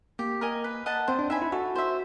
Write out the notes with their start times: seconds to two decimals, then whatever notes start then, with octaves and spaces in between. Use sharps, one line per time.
0.19 A#3 G4
0.41 A#4 D#5 G#5
0.64 B4
0.86 D#5 F#5 A5
1.08 C4 C5
1.19 D4
1.30 D#4 E5 G#5 B5
1.42 E4
1.52 F#4 A4
1.75 C5 E5